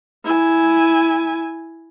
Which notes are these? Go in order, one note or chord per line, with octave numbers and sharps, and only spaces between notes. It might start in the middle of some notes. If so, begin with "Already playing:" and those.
E4 G#5